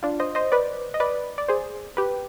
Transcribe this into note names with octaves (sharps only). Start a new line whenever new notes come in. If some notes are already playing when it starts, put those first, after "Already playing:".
D4 F4
C5 D#5
C5 D#5
B4 D5
D#5
B4 D5
D5
G#4 C5
G4 B4